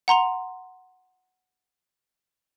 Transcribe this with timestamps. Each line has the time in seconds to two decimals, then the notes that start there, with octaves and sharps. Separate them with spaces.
0.08 F#5 A#5 C6 F7